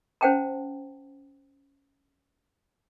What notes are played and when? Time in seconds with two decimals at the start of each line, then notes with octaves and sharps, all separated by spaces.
0.21 C#4 C5 F#5 G5 A5 A#5